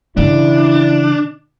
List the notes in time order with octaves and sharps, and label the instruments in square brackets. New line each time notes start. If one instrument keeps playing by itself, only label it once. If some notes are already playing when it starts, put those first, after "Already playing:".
[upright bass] C#3 E3 [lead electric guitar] D4 [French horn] E4